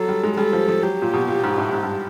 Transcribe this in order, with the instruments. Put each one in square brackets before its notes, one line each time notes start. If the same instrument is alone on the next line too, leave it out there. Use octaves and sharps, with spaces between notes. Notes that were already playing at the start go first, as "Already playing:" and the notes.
Already playing: [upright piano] F#3 [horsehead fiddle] A4
[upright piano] G3
G#3
[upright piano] G3 [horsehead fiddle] A4
[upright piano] F3
F3
[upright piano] F#3 [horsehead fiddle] G4
[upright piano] A#2
B2
A#2
G#2
A2
G#2
G2